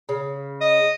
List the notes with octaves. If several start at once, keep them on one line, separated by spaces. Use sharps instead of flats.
C#3
D#5